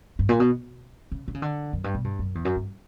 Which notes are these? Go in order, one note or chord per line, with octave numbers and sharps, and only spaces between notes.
G2
A#2
B2
C#3
D3
C#3
D3
F#2
G2
B2
G2
F#2
E2
F#2
G2